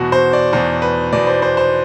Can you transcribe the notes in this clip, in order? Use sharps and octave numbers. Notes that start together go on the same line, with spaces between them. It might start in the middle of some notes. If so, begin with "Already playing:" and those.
Already playing: E2 B2 F#4
C5
D5
E2 B2 C5
B4
E2 B2 D5
C5
C5
C5